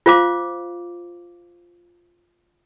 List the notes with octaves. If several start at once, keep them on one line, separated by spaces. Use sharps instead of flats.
F4 C5 F5 D6